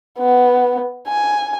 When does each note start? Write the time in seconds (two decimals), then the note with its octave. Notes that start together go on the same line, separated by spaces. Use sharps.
0.19 B3
1.08 G#5